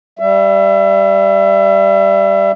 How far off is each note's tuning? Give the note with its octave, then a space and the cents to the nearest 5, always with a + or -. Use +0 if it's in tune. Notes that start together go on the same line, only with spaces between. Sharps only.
G3 +0 E5 +30